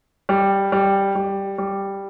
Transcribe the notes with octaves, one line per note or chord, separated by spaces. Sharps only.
G3
G3
G3
G3